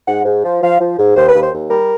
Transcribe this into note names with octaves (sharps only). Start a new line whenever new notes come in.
G#2 F#5
G#2
F3
F3 F5
F3
G#2
D#2 C5
B4
D#2
C5
D#2
G3 A#4